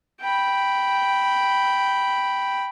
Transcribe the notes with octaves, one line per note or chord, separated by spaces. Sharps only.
G5 B5